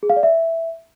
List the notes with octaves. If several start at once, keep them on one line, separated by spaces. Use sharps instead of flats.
G#4
F5
D5
E5